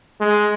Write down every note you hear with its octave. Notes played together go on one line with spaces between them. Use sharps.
G#3